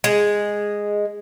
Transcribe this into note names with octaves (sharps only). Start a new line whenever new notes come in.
G#3